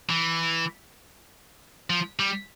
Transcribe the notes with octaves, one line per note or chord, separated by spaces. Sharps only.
E3
F3
G3